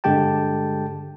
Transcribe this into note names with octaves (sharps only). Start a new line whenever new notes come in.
G2 D3 G#3 G4 G5 A5